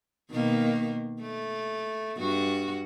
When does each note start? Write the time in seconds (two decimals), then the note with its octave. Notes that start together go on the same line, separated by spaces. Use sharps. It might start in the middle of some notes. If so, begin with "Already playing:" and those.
0.31 B2 D#3 A#3
1.21 A3
2.18 G2 F#4